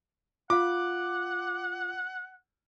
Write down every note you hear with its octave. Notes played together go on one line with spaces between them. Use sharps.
F4 F5 F#5 D6